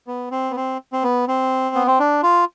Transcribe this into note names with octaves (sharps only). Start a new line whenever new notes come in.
B3
C4
B3
C4
C4
B3
C4
B3
C4
D4
F4